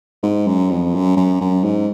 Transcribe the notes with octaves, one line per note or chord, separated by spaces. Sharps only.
G#2
F#2
F2
F#2
F#2
F#2
G#2